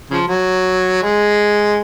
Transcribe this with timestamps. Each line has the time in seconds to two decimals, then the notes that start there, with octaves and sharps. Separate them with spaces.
0.10 C#3 F3
0.28 F#3
1.03 G#3